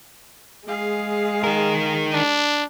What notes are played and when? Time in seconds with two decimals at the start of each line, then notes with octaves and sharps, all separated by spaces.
0.68 G#3 G#4 F5
1.44 D#4 A#4
2.14 D4